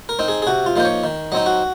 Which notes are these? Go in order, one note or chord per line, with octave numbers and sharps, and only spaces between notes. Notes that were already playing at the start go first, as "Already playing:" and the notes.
A#4
C4 D#4
G#4
G#4
C3 F#4
F4
F3 A#3 D#4 C5
C#5
D#3
F#3 C4 D#4 D#5
F#4